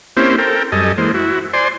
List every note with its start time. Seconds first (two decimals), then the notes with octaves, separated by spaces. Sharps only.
0.17 A#3 C4 C#4 E4 G4 C5
0.38 A4 A#4 G5
0.72 F#2 G3 A4 D#5 G#5
0.98 E3 G#3 A#3 C5
1.14 E4 F#4
1.53 C5 D5 G#5 C6